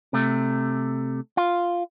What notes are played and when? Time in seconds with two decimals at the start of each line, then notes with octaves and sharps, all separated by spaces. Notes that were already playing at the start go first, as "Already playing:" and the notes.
0.13 C3 A3
1.37 F4